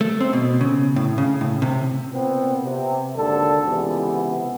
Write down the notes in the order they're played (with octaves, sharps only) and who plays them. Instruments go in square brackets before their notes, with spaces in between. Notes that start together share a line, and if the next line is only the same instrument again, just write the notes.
[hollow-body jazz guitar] A3
C4
B2
C#3
A2
C#3
A2
C3
[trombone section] A#2 B3 C4
C3
G#1 D#2 D3 A4
C#2 C3 E3 B3